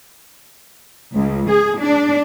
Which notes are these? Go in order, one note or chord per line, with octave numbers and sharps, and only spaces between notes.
C#2
G#4
D4